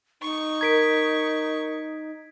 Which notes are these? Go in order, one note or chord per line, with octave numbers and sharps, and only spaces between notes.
D#4 C#6
A#4 A#5 G#6 B6 D7